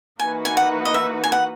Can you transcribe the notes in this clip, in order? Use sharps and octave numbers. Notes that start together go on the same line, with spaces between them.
E3 A#3 D#4 F#4 B4 G#5
G#5
F#5
D#5
E5
G#5
F#5